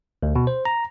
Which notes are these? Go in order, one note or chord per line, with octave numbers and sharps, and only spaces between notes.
D2
B2
C5
A#5